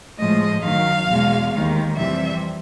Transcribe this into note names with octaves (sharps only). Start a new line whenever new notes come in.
A2 F3 G#3 D#5
F#2 D#3 F#3 F5
E2 B2 G#3
D#2 D#3 G#3
F2 C3 E3 G3 E5